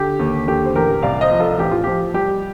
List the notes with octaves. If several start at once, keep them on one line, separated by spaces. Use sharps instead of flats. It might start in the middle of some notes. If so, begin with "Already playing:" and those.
Already playing: D3 G4
D#2
D3 G4
C5
A1 G4 A#4
C2 D5 F5
C5 D#5
F3
F4 A4
A1 G4
F4
F3 G4
G3 G4